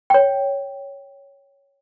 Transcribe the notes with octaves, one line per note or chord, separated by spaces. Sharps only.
C#5 G5